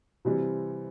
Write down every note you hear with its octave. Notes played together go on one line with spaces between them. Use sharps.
C3 E3 G3 C4